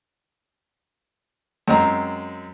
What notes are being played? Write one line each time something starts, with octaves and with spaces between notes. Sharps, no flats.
F#2 G#3 C4 A#5